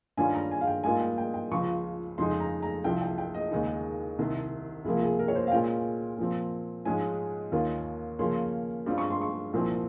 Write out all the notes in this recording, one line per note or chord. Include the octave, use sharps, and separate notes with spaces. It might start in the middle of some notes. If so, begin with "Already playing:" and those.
G2 D#3 G3 C#4 F4 G#5
A#5
G#5
F5
G5
G#2 G3 A#3 F4 G#5
G5
G5
G5
C#2 C#3 F3 C#6
F2 C#3 G#3 D#4 C6
A#5
A#5
C2 C3 F3 G5
G5
G5
D#5
D#2 C#3 G#3 D#4
C2 C3 D#3
C#2 C3 F3 A#3 G#4
G#4
A#4
C#5
C5
F5
A#2 G#3 C#4 F4 G5
A#2 F3 C4
G#2 F3 G#3 C#4 G#5
D#2 D#3 A#3 C#4 F4
C#3 F3 A#3 C#4 C6
G2 G3 C4 F4
C#6
C6
C#6
C2 A#2 F3 C4